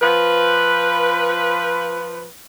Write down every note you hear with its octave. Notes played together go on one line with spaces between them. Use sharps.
F3 B4